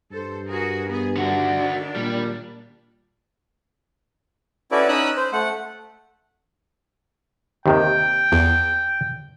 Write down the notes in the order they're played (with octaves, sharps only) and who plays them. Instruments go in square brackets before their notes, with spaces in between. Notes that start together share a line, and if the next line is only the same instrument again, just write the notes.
[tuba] G2 [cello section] A4 C5
[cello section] F#4 G#4 A#4
B3 G#4
[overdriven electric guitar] D3 F#4 [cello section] D#3 A#3 D4
[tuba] A#2 [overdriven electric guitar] G3
[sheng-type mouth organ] C#4 E4 F#4 A4 B4 D5
C#4 D#4 B5 D#6 E6 F#6
C5
A3 F#5
[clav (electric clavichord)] D#2 C3 D#3 [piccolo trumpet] G5
[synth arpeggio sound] E2